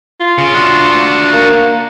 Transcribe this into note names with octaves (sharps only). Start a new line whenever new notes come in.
F4
C#3
D4 F#4
A#3